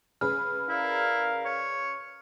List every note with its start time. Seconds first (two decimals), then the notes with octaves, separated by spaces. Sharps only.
0.21 C#3 G#4 B4 F6
0.69 E4 A#4 D5 F5
1.45 C#5